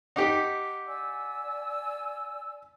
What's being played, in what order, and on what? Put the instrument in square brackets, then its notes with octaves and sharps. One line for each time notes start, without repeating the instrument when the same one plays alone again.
[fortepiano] D#4 G4 [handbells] F#5 D6 B6
[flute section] D5 G#5 E6